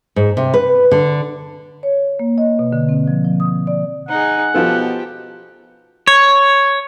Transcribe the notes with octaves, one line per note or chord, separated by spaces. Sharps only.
G#2
C3
B4
D3
C#5
A#3
D#5
B2
D3
C4
F3
F3
D#6
D5
D#4 G#4 F#5
B2 F3 F4 G4 A4
C#5